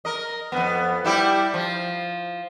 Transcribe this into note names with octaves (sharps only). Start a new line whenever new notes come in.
A#4 D#5
F2 A2 B3
G3 E4 G4
F3